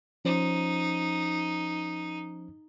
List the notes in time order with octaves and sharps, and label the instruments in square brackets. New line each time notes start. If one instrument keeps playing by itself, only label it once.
[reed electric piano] F3 C#4 C5 [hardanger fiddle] D#4